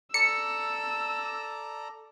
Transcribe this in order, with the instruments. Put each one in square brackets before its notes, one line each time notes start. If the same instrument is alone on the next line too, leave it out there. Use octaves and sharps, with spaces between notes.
[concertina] A4 D5 A#5 [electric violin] E6 [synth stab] C#7